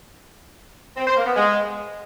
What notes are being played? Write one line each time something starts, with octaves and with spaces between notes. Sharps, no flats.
C4
C5
A#3
B3
G#3